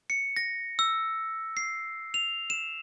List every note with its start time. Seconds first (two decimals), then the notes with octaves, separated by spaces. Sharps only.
0.10 C#7
0.36 A#6
0.79 E6
1.57 C7
2.14 F7
2.50 E7